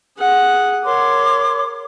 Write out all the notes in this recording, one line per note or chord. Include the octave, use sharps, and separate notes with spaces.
G#4 F#5
A#4 C#5 C6 D6